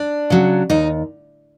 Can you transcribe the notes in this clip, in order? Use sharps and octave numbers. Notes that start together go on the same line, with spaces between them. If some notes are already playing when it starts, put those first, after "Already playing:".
Already playing: D4
C#3 F#3
D#2 D#4